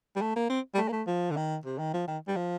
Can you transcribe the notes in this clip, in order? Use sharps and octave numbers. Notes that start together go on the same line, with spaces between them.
G3
A3
A#3
C4
G3
A3
A#3
A3
F3
D3
D#3
C3
D#3
F3
D#3
G3
F3